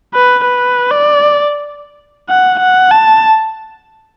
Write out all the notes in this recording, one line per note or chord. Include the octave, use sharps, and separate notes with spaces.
B4
B4
D5
F#5
F#5
A5